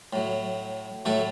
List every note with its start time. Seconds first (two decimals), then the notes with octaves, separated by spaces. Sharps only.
0.13 A2 F#3
1.05 A2 F#3 A3 A4